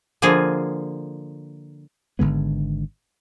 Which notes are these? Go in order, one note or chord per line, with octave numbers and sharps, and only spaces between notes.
D3 F3 A#3 F4 G#4
G#1 D3 G#3 B3